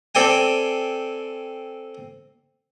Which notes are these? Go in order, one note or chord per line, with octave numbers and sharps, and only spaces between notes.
C4 A4 D5 G5 G#5